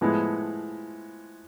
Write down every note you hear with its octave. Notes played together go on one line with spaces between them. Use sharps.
A2 F3 G#3 B3 E4